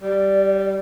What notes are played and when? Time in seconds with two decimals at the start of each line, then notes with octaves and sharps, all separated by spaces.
0.02 G3 D5